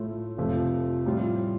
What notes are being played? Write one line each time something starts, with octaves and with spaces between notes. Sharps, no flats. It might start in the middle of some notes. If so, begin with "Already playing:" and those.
Already playing: A2 A3 F4
F1 F2 F3 A3
A2 G3 F4